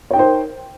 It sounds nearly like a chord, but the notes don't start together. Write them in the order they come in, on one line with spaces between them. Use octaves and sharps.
C#5 G5 D#4 C5 A#4